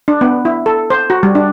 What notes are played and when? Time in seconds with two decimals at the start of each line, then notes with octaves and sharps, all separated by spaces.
0.08 D4
0.21 B3
0.45 E4
0.66 A4
0.90 C5
1.10 F#4
1.23 G3
1.35 D4